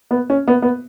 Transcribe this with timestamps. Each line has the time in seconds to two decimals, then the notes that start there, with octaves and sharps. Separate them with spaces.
0.11 B3
0.30 C#4
0.48 B3
0.62 B3